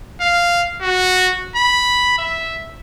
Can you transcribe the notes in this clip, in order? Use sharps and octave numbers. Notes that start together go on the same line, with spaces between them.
F5
F#4
B5
E5